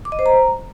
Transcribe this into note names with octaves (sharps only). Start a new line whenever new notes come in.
D6
D#5
C5
A#5